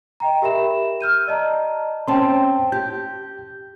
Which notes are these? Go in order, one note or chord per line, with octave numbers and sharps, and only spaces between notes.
D#5 G5 A#5
G4 A#4 E5 B5 E7
E6 F6 G6 D#7
D5 D#5 A5 A#5
C4 C#4 G5 A5 C6
G4 G6